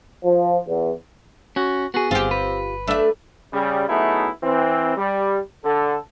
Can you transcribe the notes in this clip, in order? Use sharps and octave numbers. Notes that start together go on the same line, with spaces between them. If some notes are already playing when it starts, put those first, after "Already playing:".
F3
E2
C#4 F#4
B3 F#4 G#4
G1 C4 F4 G4
B4
A3 D4 E5
C#3 G3
F#3 A3 B3 D#4 E4 G#4
E3 C4
G3
D3 A4